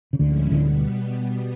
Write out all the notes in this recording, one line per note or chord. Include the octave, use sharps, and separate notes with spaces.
C#3
D2 A2 D3 F3 G#3 C#4 E4
D2 B2 D3 G3 B3